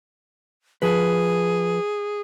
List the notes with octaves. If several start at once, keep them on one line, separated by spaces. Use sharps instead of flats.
F3 G#4 B4